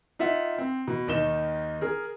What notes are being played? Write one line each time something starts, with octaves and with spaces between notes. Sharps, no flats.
D#4 F4 E5 F#5
C4
B2
D#2 D#3 D#4 E7 G7
G#4 A#4